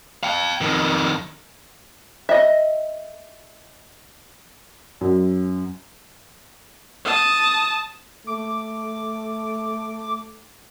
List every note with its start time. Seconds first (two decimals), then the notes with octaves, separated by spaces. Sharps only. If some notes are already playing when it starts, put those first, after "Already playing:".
0.23 F5 G5
0.61 F2 D#3
2.29 D#5 E5
5.01 F#2
7.04 A5 D#6
8.27 A3 D6